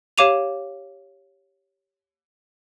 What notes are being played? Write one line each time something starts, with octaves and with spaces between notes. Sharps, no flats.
G4 C#5 F5 D6 D#7 F7